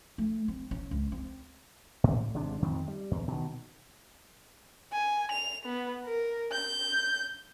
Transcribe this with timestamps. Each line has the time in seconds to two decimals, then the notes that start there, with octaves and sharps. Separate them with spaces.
0.18 A3
0.48 C4
0.71 C#4
0.91 C#2
1.12 C4
2.04 A2
2.34 G#1 C3 G#3 D4
2.62 F2 D#3 F3 C4
2.88 G3
3.11 E2
3.28 B2 D#3
4.92 G#5
5.32 F7
5.65 B3
6.05 A#4
6.52 G6